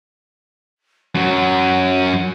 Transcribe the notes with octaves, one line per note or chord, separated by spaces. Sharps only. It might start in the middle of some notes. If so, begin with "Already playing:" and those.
F#2 F#3 F#5